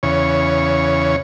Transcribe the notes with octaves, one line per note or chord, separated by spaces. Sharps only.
E2 C#3 C#5